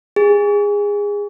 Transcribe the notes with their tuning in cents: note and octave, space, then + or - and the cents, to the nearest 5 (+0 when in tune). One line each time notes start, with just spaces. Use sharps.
G#4 -20